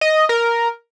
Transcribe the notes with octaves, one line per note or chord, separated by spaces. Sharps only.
D#5
A#4